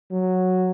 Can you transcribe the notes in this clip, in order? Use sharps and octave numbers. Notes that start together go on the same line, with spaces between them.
F#3